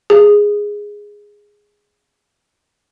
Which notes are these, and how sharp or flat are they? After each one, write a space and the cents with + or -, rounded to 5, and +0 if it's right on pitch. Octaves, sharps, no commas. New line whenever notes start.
G#4 -5